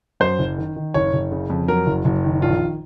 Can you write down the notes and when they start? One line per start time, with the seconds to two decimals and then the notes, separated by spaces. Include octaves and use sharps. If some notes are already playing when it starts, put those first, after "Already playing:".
0.20 F#2 C5
0.39 F#1
0.58 D#3
0.76 D#3
0.94 F#1 C#5
1.13 F#1
1.32 C#3
1.50 F2
1.68 F#3 A#4
1.86 F#1
2.05 F#1
2.24 D#3
2.42 A#1 F4